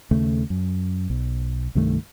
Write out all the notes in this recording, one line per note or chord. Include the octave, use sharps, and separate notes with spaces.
D#2 C#3 A3
F#2
B1
C2 G2 D#3 A3